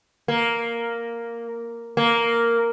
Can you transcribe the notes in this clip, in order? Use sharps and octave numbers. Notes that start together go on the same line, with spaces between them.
A#3
A#3